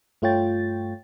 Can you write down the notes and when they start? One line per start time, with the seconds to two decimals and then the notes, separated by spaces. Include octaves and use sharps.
0.22 G2 A3 F4 C#5 G5 A6